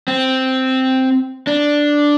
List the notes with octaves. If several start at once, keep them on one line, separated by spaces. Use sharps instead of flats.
C4
D4